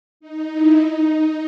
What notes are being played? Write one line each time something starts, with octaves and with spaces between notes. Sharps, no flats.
D#4
E4
D#4